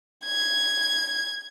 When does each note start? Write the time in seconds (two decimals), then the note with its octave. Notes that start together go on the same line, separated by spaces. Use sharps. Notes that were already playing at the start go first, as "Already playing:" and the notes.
0.25 G#6